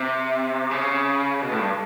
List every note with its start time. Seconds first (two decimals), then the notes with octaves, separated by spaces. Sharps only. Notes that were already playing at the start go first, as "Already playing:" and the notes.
Already playing: C3
0.71 C#3
1.42 B2
1.51 A2
1.60 G2